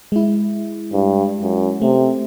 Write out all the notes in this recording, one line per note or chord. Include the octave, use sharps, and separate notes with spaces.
G#3 E4
G2
F#2
C3 A3